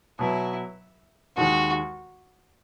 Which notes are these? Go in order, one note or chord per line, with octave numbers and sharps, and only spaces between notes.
B2 F#3 B3 E4
D#2 D#3 G#3 F#4